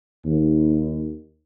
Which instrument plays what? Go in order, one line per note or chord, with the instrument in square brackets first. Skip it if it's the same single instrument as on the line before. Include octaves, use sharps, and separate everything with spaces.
[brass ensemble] D#2